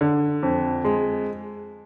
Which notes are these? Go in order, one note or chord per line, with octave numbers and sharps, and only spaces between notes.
D3
F2
G#3